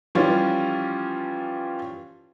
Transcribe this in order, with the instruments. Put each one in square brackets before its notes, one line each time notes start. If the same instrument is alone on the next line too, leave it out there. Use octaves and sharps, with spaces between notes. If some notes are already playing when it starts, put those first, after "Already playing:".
[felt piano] E3 F3 G3 C#4 F4